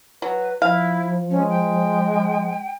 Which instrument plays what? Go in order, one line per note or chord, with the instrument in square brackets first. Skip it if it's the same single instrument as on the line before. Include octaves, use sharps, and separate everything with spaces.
[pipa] F#3 [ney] B4
[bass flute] F3 [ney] E4 [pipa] F5
[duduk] G#3 [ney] C#4
[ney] G5